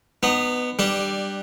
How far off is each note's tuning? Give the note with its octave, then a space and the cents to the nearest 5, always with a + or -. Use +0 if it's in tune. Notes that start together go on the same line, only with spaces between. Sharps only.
B3 +10 D#4 -30
G3 +0 D4 +15